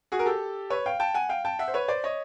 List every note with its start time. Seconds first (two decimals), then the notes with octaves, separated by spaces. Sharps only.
0.12 F#4 G#4
0.19 A#4
0.26 G4 A4
0.70 B4 C#5
0.86 F5 G5
1.00 G5 A5
1.14 F#5 G#5
1.29 F5 G5
1.45 G5 A5
1.59 E5 F#5
1.68 C5
1.74 B4 C#5
1.88 C5 D5
2.04 C#5 D#5